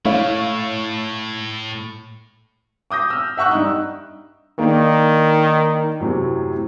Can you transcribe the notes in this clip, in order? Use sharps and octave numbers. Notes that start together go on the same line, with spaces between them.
A2 A3 E4 C#5 F5
D6 D#6 G6 A#6
E6 F6
E5 F#5 C#6 E6 F#6
G2 D#4
D#3 A#3 D4
F#2 A2 C3